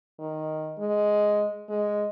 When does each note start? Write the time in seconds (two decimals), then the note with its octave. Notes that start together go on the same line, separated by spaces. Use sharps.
0.19 D#3
0.78 G#3
1.69 G#3